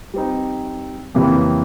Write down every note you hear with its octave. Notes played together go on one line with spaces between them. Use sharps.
G3 C4 D#4
F2 C#3 E3 G3 A#3